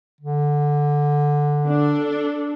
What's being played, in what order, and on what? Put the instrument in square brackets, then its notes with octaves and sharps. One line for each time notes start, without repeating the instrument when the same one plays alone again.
[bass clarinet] D3
[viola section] D4 A4